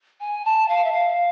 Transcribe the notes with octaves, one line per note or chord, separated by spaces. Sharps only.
G#5
A5
F5
E5
F5